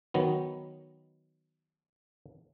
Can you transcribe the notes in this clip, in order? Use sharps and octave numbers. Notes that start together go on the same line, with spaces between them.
D#3 F#3 B3